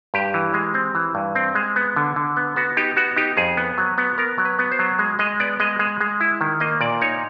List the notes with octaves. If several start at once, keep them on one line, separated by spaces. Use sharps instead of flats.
G2 G4
E3
G#3
C4
E3
G2
C4
G#3
B3
D3
D3
B3
B3 F#4
D#4 G4
B3 F#4
D#4 G4
F2 G#4
B3
F#3
B3
B3 A#4
F#3
B4
B3
C5
F#3
G#3
G#3 D#5
B3 D5
G#3 D#5
G#3
G#3
E4
D#3
A#3 D#5
A#2 D5
D#4 C#5